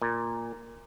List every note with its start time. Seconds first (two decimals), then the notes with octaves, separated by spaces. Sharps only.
0.02 A#2